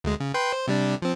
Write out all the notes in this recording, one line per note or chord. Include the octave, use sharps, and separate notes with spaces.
D2 G#3
C#3
B4 G5 C6
C5
C3 G3 D4
F3 C4